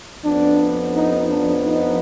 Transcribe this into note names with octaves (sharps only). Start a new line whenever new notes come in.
F2 F3 B3 D4
D#4
D4
D#4